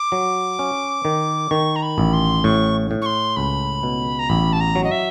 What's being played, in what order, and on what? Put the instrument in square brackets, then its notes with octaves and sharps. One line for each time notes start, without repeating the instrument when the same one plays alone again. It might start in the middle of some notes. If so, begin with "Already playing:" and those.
Already playing: [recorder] D6
[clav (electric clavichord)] F#3
C#4
D#3
[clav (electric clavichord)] D#3 [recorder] C#6
[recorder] A#5
B5
[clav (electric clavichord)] A1
[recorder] C6
[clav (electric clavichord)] A2 [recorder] C#6
[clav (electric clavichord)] A2
[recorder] C#6
C6
[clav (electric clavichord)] C#2 [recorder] B5
[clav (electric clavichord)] B2
[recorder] A#5
[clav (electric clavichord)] A1 [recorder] B5
[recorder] A5
A#5
[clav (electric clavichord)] F#3
[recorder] D#5
E5